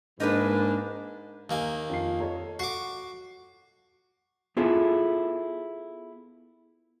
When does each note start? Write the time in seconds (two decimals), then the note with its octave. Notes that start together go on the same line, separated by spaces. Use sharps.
0.20 G#2 E3 A#3 D4 D#4 B4
1.50 D#2 A#3 G#5
1.89 F2 F4 C7
2.20 A4 C#5 D#5
2.59 F#4 D6 C7
4.57 B3 E4 F4 G#4 A4